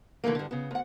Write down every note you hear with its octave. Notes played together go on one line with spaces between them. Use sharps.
D3 E3 F#3 A3 A#3
G2 D3
C#3 B3
D2 F#5